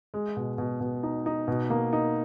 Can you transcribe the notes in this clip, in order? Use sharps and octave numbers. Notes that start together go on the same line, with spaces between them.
G#3
B2
B2
B2
D#4
D#4
B2
A#3
D#4